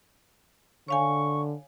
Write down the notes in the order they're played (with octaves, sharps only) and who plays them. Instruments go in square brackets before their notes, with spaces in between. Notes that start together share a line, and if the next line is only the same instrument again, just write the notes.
[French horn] D3 [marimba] C#5 F5 G#5 [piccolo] C#6